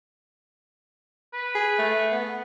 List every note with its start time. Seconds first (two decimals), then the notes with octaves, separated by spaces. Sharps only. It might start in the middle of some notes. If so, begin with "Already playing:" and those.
1.33 B4
1.55 G#4
1.79 A3
2.12 B3